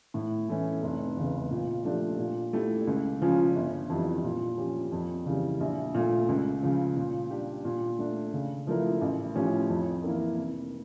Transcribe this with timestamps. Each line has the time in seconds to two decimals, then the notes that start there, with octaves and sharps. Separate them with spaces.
0.14 A2
0.49 E3 A3 C#4
0.83 F1
1.16 E2 C#3
1.51 A#2
1.85 F3 A3 D4 G4
2.19 A#2
2.53 A3 E4 G4
2.87 C#2
3.21 C#3 F3 C#4 F4
3.56 G1
3.89 F2 E3 G3
4.24 A#2
4.58 F3 C#4 G4
4.92 F2
5.26 C#3 E3 G3
5.60 A#1
5.95 A#2 A3
6.28 C#2
6.63 C#3 F3
6.97 A#2
7.31 G3 D4 G4
7.65 A#2
7.99 A3 D4
8.33 C#3
8.67 F3 A3 E4 A#4
9.01 A1
9.35 A2 F3 C#4 G4
9.69 F2
10.04 E3 A#3 E4 A#4
10.38 F1